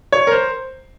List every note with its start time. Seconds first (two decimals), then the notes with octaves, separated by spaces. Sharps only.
0.12 C#5
0.27 A#4
0.32 C5